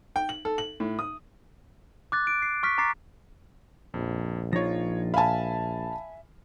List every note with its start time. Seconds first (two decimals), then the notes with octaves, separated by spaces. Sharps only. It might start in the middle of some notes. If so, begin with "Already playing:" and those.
0.16 G5
0.29 F#7
0.45 A4
0.58 F#7
0.80 A2
0.99 D#6
2.12 D6 F#6 A6
2.27 D7
2.42 C7
2.63 C#6 F6 B6
2.78 A#5 D6 A6 C7
3.94 A#1 F2
4.53 F3 D#4 F4 C#5 A#6
5.14 E5 F5 G#5 A5 B5